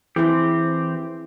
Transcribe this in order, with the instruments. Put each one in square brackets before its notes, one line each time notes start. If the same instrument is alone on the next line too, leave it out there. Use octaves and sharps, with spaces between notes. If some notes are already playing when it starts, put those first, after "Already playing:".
[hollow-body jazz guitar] E3 [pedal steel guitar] C4 G4 [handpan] E4 G#4